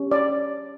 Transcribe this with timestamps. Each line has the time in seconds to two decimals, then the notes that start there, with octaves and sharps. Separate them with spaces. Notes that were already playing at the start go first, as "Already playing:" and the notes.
Already playing: C#4 G4
0.12 D5